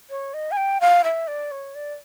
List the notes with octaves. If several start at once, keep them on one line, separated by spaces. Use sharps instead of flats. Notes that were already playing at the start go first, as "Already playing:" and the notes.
C#5
D#5
G#5
G5
F5
E5
D5
C#5
D5